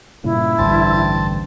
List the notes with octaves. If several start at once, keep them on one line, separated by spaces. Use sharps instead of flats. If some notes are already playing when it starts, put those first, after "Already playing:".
G2 A#2 C#3 E4
A1 D2 G2 C4 A5